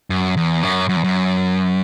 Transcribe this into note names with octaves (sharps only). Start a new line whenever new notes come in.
F#2
E2
F#2
F#2
E2
F#2